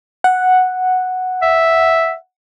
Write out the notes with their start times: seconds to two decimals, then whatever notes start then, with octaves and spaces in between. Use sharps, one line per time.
0.24 F#5
1.42 E5